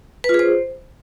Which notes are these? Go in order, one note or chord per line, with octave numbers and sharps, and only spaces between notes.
B4
F4
G#4
C5